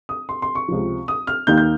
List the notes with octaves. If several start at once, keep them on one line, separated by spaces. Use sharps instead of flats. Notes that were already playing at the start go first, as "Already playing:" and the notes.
D#6
C6
C6
C#6
C#2 C3 F3
D#6
F6
D#2 D#3 A#3 D#4 G6
G6